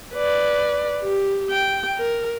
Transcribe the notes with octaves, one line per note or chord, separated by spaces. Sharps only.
B4 D5
G4
G5
A#4